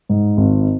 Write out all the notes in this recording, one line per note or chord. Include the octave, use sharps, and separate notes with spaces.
G#2
G#1